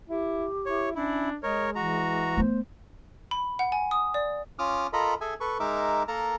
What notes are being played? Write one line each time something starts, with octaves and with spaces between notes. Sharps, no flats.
E4 G4
E4 C#5
C#4 D4 E4
G#3 A#4 C#5 D#5
E3 F#4 A#5
A3 B3 C5
B5
F#5
G#5
D#6
D5
C#4 F4 D6 D#6 F6
F4 A4 A#4 D#5 A#5 B5
G#4 A4 E5 G#5
A4 B4 C#6
G#3 D#4 A#4 E5 D6
A#3 A4 A#4 A5 A#5